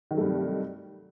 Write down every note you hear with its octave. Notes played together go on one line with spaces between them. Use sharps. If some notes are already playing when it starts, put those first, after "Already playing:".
G2 C3 D#3 F#3 A3